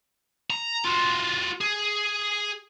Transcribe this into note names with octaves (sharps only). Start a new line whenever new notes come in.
A#5
F4 F#4
G#4